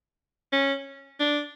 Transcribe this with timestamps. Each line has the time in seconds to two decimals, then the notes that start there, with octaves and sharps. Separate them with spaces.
0.53 C#4
1.20 D4